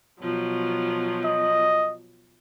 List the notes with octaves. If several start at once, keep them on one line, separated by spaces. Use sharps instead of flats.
B2 F3 F#3
D#5